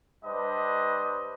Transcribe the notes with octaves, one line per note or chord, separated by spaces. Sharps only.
G3 D4 B4 C5 D#5